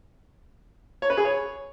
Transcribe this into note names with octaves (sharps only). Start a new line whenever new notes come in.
C#5
B4
G#4
C#5